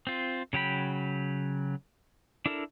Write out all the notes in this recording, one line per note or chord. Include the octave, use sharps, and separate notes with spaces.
C4 F4
C#3 F#3 G5 B5
D4 E4 A4 A#4